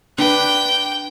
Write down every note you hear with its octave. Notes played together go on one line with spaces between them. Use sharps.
D4 B4 G5